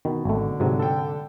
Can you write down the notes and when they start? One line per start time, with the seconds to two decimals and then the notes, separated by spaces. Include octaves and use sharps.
0.05 B2 D#3
0.25 G#1 D3 A3
0.60 G#2 C3 F#3
0.79 A4 G5